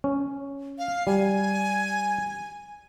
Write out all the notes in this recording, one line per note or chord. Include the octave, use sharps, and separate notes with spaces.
C#4
F5
G3 G#5